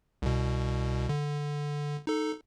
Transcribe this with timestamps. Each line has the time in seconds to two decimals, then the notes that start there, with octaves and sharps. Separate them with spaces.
0.22 C2 B2
1.09 D3
2.07 D#4 A4